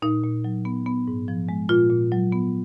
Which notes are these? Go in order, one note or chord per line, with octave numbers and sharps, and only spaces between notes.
A#2 D#4
A#2
F#3
B3
B3
G#2
F3
G#3
A#2 F4
A#2
F#3
B3